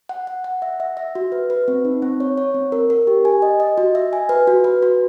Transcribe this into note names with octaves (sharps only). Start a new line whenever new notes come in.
F#5
F#5
F#5
E5
E5
E5
F#4
B4
B4
C4
D#4
C4
C#5
C#5
C4
A#4
A#4
G4
G#5
D#5
D#5
F#4
E5
G#5
B4
F#4
B4
F#4